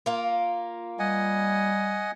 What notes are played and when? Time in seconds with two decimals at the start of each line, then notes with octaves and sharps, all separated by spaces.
0.06 A#3 F4
0.99 G3 D#5 F#5 G#5